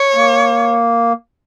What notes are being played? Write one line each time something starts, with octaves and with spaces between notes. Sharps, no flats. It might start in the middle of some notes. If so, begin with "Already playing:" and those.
Already playing: C#5
A#3